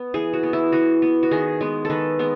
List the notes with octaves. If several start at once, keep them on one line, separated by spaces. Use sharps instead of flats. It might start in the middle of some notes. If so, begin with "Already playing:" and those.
Already playing: B3
E3 G#4
F#4
B3
E4
E3 F#4
B3
F#4
D#3 G#4
G#3 B3
A4
D#3 B4
G#3 B3